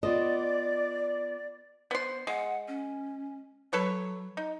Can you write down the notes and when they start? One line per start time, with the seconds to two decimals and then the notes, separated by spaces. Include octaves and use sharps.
0.03 B3 F4 D5 D#5 A5
1.91 B3 C5 C6
2.27 G#3 F#5
2.68 C#4
3.73 F#3 A4 B4 C#5
4.37 D#4